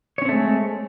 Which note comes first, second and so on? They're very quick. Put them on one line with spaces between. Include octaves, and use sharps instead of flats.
C#5 C#4 C4 A3 G#3